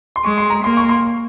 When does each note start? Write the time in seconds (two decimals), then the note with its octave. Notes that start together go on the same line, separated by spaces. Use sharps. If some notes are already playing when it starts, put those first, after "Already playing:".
0.16 C6
0.24 G#3 C#6
0.38 C6
0.50 A#5
0.64 A#3 C6
0.77 C#6
0.89 C6